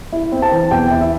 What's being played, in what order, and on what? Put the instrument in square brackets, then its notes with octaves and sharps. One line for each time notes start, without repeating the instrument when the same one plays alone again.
[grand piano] E4
C4
A5
E3
E2 G5
E4
E5